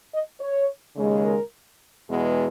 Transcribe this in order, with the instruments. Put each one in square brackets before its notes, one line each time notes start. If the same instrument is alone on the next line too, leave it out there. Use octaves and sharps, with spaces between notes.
[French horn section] D#5
C#5
D#2 C#3 G#3
A#4
E2 B2 G#3 B3